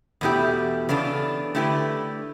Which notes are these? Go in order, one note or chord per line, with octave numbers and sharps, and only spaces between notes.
E2 B2 A3 E4 G4
C#3 E3 B3 D4 A4
D3 A3 E4 G4 B4